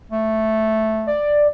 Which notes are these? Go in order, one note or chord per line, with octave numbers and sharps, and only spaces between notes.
A3
D5